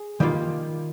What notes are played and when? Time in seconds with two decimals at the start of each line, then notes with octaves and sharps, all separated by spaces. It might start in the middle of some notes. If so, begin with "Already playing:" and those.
Already playing: G#4
0.20 D#3 G3 A#3 F4